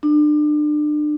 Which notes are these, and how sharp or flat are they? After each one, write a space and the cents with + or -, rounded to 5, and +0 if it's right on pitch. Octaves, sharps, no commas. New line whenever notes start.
D4 +35